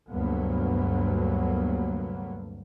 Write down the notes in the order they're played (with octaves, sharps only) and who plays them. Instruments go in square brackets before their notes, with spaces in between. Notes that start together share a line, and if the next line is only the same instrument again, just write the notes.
[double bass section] D2 G2 C3 F#3 A#3 B3